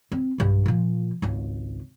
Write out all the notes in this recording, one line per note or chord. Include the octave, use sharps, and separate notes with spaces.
C4
B1 G2
A#2 F3
G#1 C#2